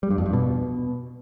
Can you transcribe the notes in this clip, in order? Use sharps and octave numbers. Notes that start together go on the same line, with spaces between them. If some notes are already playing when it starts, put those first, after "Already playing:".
G3
G2
F2
G2
B2